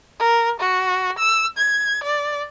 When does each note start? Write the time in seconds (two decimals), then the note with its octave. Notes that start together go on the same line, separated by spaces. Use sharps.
0.20 A#4
0.60 F#4
1.19 E6
1.58 G#6
2.04 D5